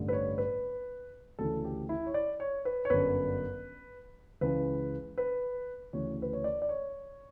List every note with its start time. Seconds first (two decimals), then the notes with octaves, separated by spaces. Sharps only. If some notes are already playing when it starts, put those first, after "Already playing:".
Already playing: A1 G2 D3
0.08 B4
0.13 C#5
0.38 B4
1.39 D2 C#3 E3 A4
1.64 G4
1.89 E4
2.06 C#5
2.14 D5
2.40 C#5
2.65 B4
2.85 C#5
2.90 G1 F#2 D3 B4
4.41 C#2 C#3 E3 B4
5.18 B4
5.93 D2 C#3 E3 C#5
6.22 B4
6.33 C#5
6.44 D5
6.62 D5
6.69 C#5